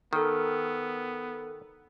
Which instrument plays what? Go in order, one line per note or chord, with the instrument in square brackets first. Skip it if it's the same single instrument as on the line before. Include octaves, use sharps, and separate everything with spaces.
[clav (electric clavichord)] D#3 [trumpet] B3 [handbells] A4 A#4